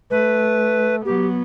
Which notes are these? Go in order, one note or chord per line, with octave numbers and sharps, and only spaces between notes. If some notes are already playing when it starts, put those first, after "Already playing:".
A3 B4
F#3 B3 G4